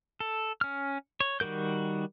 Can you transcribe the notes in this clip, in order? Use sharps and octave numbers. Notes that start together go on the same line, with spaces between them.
A4
C#4 F6
C#5
D#3 G3 F#4 A#4 G6